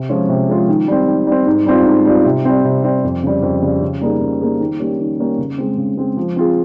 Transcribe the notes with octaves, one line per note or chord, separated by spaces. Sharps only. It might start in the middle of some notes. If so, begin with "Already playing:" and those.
Already playing: C3
F3 G#3 C#4 F4
C3
F3 G#3 C#4 F4
D#3
G3 C4
D#3
G3 C4
G#2
G3 C4 F4
G#2
G3 C4 F4
C3
G3 C4
C3
G3 C4
F2
C#3 G3
F2
C#3 G3
C#3
G3 A#3 D#4 G#4
C#3
G3 A#3 D#4 G#4
D#3
G3 A#3 C#4 G4
D#3
G3 A#3 C#4 G4
C#3
G#3 C4
C#3
G#3 C4
F3
C4 F4 G#4